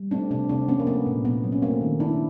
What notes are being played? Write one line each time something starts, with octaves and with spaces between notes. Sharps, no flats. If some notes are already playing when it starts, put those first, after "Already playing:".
Already playing: G3
A3 C4 D4
C3 C4 D4
C3 C4 D4
F3 B3 C#4
A#3
A3 B3
A#2
A#2 B3
F#3
C#4
A3 A#3 C4
D#3
D#3 D4 E4